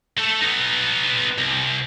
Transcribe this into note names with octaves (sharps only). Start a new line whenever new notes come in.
A3 A4
B3 D#4
C2